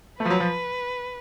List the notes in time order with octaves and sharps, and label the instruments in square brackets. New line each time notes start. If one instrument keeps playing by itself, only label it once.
[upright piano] A3 [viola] B4
[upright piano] F3
F#3
F3